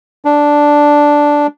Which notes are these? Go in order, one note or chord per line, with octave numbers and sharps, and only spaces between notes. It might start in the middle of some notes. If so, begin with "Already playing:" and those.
D4